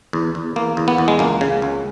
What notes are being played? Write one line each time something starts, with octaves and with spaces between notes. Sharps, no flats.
E2
E2
E2 A#3
E2
B3
E2
G#3
C#2 A#3
C#3
C#2